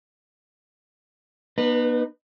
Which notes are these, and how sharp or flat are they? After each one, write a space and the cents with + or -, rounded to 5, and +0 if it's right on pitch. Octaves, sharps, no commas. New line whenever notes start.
B3 -40 D#4 -40 B4 +0